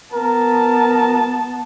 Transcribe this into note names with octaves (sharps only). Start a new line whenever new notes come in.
B3 A#4 A5